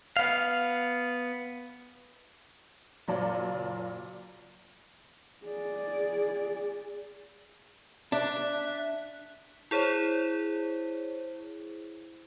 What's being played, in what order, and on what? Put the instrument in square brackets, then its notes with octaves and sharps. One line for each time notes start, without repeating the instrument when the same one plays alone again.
[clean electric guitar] B3 F5
[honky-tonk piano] F#1 A#2 F#3 F4 D5 A5
[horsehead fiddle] G#4 D5
[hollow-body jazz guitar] D4 [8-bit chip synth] E5 F#6
[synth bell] E4 G#4 C5 C#5